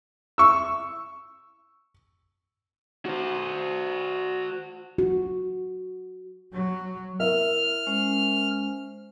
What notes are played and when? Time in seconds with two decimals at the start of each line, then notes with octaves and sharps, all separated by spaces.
0.38 C#6 E6
3.06 F#4 C5
4.98 F#4
6.53 F#3
7.20 E4 A#4 E5 F6
7.87 G#3 C#4 C5